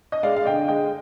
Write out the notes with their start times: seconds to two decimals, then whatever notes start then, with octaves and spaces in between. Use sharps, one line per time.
0.12 D#5
0.23 G#3 D5 F5
0.36 F5
0.45 D3 D#5 G5
0.68 G#3 D#5 G5